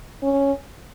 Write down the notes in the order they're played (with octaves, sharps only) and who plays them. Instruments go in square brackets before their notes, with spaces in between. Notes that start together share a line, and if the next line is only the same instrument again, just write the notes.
[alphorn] C#4